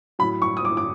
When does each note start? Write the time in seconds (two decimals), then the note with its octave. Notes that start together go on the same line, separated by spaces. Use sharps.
0.19 A2 F#3 B5
0.42 C#6
0.57 D#6
0.65 D6
0.77 D6